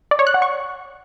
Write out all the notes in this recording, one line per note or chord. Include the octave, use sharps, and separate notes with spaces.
D5
C#5
F#6
F#5
C#6